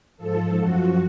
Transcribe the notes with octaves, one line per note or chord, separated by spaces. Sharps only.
G#2 F3 A4
F#2 F3 F#4